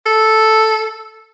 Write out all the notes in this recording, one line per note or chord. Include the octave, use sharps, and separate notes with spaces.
A4